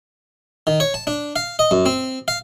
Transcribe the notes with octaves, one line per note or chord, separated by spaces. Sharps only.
D#3
C#5
A5
D4
F5
D#5
F#2
C4
F5